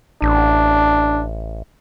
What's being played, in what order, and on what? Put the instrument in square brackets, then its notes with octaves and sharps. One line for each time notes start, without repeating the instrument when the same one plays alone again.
[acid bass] A1 [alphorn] D4